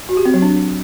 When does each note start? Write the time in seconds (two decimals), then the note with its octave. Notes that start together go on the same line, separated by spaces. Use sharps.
0.09 F#4
0.17 G4
0.25 C4
0.34 F#3
0.42 D4